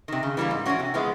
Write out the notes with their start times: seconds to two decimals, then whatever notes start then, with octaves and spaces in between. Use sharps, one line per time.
0.08 C3 D#3
0.23 C#3
0.37 E3 G3 A#3
0.51 G#2
0.66 E3 G#3 C#4 F#4
0.80 C3
0.94 F3 G#3 B3 E4